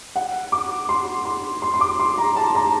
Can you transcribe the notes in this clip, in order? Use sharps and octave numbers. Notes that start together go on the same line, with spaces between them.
F#5
D6
C6
C6
C6
C6
D6
C6
A#5
A5
A#5